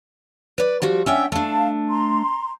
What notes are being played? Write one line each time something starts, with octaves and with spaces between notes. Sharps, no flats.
B4 D5
F3 G3 F#4
C#4 D4 E5 F#5 G5 E6
A3 D4 F5 A5
A#5 C6